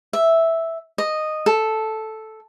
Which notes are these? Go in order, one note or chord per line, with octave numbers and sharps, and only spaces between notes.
E5
D#5
A4